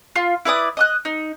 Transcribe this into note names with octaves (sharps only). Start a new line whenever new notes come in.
F4
E4 B4 D5 D#6
D#5 D#6 F#6
D#4